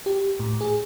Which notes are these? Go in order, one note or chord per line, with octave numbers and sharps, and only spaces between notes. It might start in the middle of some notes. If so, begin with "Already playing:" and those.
G4
A2
G#4